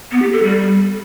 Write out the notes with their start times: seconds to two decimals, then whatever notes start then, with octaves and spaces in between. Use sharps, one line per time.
0.11 B3
0.22 G4
0.33 A4
0.43 G3